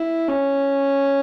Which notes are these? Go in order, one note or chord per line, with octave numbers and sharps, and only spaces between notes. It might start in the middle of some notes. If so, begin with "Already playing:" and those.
Already playing: E4
C#4